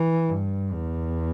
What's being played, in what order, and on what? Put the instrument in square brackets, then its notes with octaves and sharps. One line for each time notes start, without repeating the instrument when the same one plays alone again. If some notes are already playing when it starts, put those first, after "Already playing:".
Already playing: [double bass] E3
G2
E2